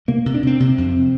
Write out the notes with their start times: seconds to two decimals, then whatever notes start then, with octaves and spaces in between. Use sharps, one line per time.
0.08 C3 A#3
0.26 C3
0.35 D4
0.43 C3 C4
0.60 C3 C4
0.78 F2